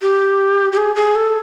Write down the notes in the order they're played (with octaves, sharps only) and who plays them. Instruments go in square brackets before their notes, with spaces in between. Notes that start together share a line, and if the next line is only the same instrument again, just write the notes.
[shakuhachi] G4
G4
G#4
G#4
A4